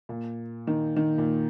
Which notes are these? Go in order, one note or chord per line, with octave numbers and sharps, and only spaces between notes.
A#2
D#3
D#3
A#2